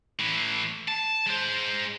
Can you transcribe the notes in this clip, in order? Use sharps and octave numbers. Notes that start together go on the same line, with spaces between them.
A2 E3
A5
G#3 C5